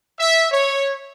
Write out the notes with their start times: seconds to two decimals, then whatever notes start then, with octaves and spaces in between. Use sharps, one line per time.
0.19 E5
0.52 C#5